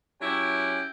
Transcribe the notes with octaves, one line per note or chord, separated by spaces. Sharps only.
F#3 C#4 E4 G4 G5